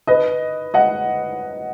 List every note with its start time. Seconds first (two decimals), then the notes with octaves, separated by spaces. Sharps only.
0.07 B4 D#5
0.74 D#5 F#5